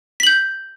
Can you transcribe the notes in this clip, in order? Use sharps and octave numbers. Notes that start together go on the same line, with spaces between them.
G6 B6 F#7